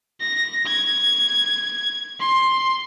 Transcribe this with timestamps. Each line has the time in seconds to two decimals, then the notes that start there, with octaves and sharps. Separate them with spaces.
0.21 A#6
0.67 G#6
2.20 C6